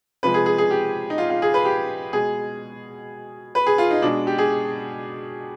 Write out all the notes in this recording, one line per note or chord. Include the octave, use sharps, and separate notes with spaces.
C3 F3 G#3 B4
G#4
G#4
G#4
G4
D#4
F4
F4
G#4
B4
G4
B2 G#3 G#4
B4
G#4
F4
D#4
B2 G#3 D4
G4
G#4